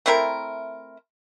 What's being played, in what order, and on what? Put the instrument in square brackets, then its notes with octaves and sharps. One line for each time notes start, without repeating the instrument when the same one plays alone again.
[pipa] A3 C4 E4 A#4